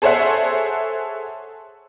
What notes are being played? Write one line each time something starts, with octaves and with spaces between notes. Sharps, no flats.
G#4 A4 C5 C#5 E5 F#5